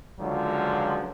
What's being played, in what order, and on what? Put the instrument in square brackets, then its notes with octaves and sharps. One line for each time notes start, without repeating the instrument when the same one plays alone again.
[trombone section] C#2 D3 F3 F#3 G#3